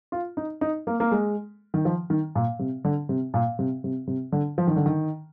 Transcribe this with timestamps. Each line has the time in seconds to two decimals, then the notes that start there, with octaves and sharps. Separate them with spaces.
0.12 F4
0.37 D#4
0.61 D#4
0.87 A#3
1.00 A#3
1.11 G#3
1.74 D#3
1.85 F3
2.10 D#3
2.35 A#2
2.59 C3
2.84 D3
3.09 C3
3.34 A#2
3.59 C3
3.84 C3
4.07 C3
4.32 D3
4.58 F3
4.67 D#3
4.76 D3
4.86 D#3